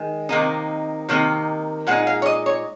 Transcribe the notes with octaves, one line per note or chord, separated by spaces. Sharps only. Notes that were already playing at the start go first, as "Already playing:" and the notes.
Already playing: D#3 G#3
C3 D#3 A#3 D#4
C3 D#3 A#3 D#4
A#2 G#3 D#4 F#5
F5
C#5
D#5
C#5